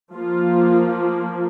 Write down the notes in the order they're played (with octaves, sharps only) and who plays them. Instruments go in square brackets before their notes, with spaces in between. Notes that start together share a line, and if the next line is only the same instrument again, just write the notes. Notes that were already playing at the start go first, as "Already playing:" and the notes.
[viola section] F3 A#3 F4